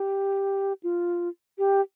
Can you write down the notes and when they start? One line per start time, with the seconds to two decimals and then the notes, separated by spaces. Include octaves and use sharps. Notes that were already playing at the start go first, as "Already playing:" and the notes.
Already playing: G4
0.83 F4
1.58 G4